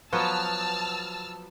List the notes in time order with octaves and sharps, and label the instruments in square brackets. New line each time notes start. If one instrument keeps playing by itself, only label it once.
[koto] F3 F#3 B3 [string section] A5 E6 F6